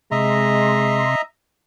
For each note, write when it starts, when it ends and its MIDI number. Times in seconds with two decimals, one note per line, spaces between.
0.11 1.15 48
0.11 1.05 56
0.11 1.22 75
0.11 1.22 76
0.11 1.22 82
0.11 1.15 84